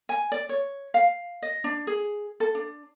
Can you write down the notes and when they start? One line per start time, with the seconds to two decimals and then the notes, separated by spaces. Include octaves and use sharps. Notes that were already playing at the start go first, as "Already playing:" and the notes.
0.09 G#5
0.32 D5
0.49 C#5
0.94 F5
1.42 D#5
1.64 D4
1.87 G#4
2.40 A4
2.55 D4